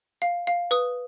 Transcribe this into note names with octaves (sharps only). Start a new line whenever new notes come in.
F5
F5
B4 D#6